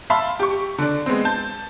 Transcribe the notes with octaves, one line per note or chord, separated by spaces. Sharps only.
E5 F5 A5 B5 C6
G4 C#6
D3 D4
G#3 B3 C4
A5 G6